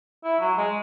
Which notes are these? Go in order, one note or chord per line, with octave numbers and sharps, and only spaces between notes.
E4
F#3
G#3